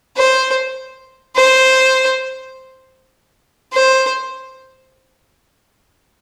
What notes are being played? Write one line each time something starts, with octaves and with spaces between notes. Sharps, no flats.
C5
C5
C5